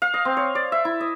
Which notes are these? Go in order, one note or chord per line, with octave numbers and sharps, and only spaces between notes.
F5
D#5
C4
C#5
D5
E5
E4
D#5